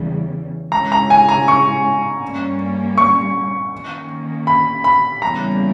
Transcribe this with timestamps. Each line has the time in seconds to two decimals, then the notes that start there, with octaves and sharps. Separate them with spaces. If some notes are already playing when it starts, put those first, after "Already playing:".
Already playing: E2 C#3 E3 G3
0.72 C#3 G#3 C#4 E4 A#5
0.92 A#5
1.10 G#5
1.29 A#5
1.48 C#6
2.23 G2 G3 A#3 C#4
2.98 C#6
3.72 D#3 A#3 C#4
4.47 B5
4.84 B5
5.22 E2 C#3 G3 A#3 A#5